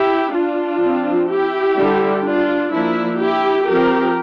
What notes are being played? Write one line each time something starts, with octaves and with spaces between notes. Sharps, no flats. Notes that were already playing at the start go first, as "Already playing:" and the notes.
Already playing: E4 G4
D4 F4
F3 C4
E4 G4
D3 G3 D4
D4 F4
F3 A#3 D4 E4
E4 G4
F3 C4 G4 A#4